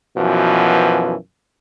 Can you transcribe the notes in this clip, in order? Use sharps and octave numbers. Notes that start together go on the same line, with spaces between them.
F#2 B2 E3 F3